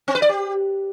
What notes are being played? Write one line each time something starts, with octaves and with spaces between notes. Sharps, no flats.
C4
B4
D5
G4